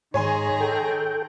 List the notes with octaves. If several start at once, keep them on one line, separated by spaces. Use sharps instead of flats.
G#2 D#3 G#4 C#5 G#5 A#5 C6
A4 G5